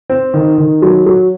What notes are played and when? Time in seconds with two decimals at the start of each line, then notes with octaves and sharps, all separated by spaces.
0.10 C4
0.34 D#3
0.58 D#3
0.82 F#3
1.06 F#3